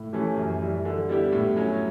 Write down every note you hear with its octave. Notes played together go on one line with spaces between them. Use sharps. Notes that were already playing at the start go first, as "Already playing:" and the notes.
Already playing: A2
E3 A3 C#4 G4
F#2
E3 G3
D3
G3 B3 E4 G4
A2
F#3 C#4